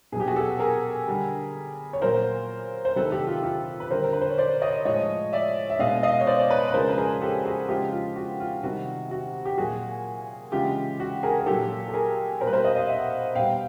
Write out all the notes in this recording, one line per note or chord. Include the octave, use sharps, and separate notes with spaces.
B2 F#3 G4 G#4
F#4 G#4
G4 A4
G#4 A#4
D3 G3
C#5
A#2 F#3 A#4 C5
C5
C3 D#3 F#3 A4 B4
G4 A4
F4 G4
F4 G4
B4
D3 G3 A#4 C5
A#4
B4
C5
C#5
C5 D5
C#5 D#5
A2 F3 G#3 C#5 D#5
D5 E5
E5
B2 G#3 D#5 F5
D#5 F5
C#5
C5 D5
D5
B4 C#5
B4
C#3 F3 G#3 A#4 C5
B4
G#4 A#4
G4 A4
F#4 G#4
C#3 F3 G#3 F4 G4
F4
F#4
F4
C3 D#3 G3 F#4
F#4
G4
A#2 F#3 F#4 G#4
C#3 E3 G#3 F4 G4
F#4
G#4 A#4
A#4
A#2 F#3 G4 A4
A4
G#4 A#4
B2 A#4 C5
G3 B4
A#4 C5
D#5 F5
D#5 F5
E5 F#5
B2 G3 F5 G5